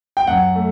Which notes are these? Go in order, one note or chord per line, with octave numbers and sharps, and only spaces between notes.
G5
F#2 F#5
A3